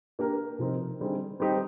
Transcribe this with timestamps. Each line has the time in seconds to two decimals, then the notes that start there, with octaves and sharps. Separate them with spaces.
0.19 A#3 D4 G4 A#4
0.59 C3 F3 C4 D#4 A#4
1.00 D3 G3 C4 D#4 G#4
1.40 G3 C4 D#4 G4 C5